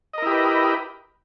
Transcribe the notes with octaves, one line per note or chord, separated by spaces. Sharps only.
E4 G4 A#4 B4 D#5